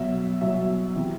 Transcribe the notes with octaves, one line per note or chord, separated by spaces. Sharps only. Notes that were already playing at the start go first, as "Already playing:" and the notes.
Already playing: B2 F#3 E5
B2 F#3 E5
C3 E3